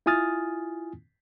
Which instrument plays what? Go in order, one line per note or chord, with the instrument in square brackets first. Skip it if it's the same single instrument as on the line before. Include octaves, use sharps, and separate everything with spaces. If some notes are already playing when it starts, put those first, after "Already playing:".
[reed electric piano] E4 F4 G#5 D#6 F6 A6